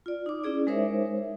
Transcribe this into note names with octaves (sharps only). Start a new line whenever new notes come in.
F4 D5
D#4 D6
C#4 E4 G#4 D5
G#3 D#4 A#4 C5 C#5 E5